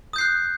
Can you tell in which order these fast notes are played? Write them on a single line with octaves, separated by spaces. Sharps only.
D#6 G6 C7 F#6